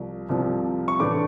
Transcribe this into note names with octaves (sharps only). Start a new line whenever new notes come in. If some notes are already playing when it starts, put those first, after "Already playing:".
Already playing: C2 C3 F3
C2 C3 F3
C#6
A2 E3 A3 D4 D6